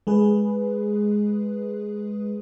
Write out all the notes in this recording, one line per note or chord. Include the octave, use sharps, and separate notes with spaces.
G#3 G#4 B4